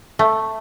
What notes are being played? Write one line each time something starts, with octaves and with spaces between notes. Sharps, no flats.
A3